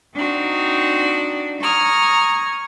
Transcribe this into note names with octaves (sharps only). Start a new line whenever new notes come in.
C4 D4 D#4 F#4
A#5 C#6 D#6 F6 G#6